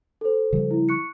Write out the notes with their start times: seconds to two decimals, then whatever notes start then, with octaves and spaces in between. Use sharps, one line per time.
0.21 A4 C5
0.53 C#3 F3 G3
0.71 E4
0.89 C#6 F#6 C#7